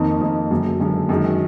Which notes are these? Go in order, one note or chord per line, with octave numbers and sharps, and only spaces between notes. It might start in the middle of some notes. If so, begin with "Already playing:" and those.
Already playing: F2 D#3 A#3 D#4
F2 D#3 A#3 D#4
F#1 F#2 D3 G#3
F#1 F#2 D3 G#3
F#2 D#3 G#3